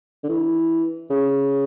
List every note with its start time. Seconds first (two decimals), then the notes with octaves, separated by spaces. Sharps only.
0.23 D3
0.29 E3
1.10 C#3